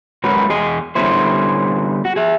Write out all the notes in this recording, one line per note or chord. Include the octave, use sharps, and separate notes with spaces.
F#3 G#3 C#4 F#4 A#4 B4
E2 G#4 D#5
D3 G3 B3 C#4 E4 C5
F#4
G#4 E5